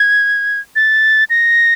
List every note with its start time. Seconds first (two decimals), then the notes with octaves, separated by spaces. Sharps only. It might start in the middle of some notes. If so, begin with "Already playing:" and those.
Already playing: G#6
0.76 A6
1.30 A#6